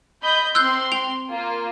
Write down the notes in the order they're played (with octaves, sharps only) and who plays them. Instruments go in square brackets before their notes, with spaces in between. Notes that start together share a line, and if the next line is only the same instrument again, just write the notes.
[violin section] D#5 B5 G6
[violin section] C4 C6 [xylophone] E6 F#6 G6
[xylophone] G5 F7
[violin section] A#3 F4